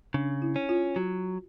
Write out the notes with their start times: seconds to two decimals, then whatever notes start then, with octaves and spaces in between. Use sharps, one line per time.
0.14 C#3 D4
0.42 E4
0.56 C#4
0.69 F4
0.96 F#3 F#4